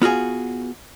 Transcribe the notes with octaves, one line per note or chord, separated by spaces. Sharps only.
B3 F4 F#4 G#4